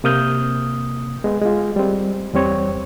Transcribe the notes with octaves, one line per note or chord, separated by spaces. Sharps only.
C3 A#3 D#6 F6 G6
G#3 B3
G#3 F4
G3 C4
E2 G3 C4 C#5